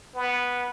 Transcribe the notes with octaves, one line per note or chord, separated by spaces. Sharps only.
B3